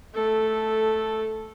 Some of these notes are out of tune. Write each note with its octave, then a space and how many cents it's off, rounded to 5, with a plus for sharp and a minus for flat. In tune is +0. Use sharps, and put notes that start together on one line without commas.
A3 -10 A4 +0